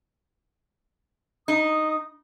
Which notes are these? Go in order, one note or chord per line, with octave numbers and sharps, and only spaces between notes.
D#4 D#6